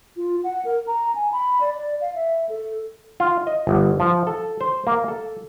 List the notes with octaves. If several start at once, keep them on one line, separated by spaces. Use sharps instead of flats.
F4
F#5
A#4
A#5
G#5
B5
D5
D5
F5
E5
A4
F4
D#5
G1
F3
A4
C5
A#3
A4